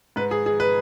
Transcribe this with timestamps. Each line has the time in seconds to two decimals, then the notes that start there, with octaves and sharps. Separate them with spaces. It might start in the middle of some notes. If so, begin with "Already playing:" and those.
0.16 G#2 B4
0.31 G#4
0.46 G#4
0.60 B4